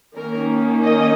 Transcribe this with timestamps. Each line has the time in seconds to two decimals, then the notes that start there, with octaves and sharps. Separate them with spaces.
0.16 D#3 A#3 C#4 A#4
0.84 D#5